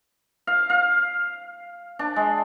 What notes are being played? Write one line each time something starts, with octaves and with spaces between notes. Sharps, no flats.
F5
F5
D4
G#3